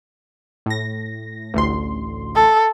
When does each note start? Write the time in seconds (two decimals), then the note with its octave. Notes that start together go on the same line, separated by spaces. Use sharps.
0.66 A2 A#6
1.54 A1 D2 C6
2.35 A4